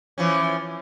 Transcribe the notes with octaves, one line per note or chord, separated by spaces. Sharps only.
E3 F3 C#4